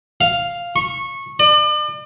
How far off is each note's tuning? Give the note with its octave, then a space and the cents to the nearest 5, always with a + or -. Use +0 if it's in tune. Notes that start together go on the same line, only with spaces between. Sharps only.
F5 +0
C#6 -15
D5 +40